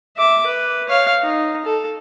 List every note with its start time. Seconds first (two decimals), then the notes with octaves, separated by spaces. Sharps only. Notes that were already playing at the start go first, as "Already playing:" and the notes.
0.17 E5 D6
0.46 B4
0.89 C#5 F5
1.22 D#4
1.65 A4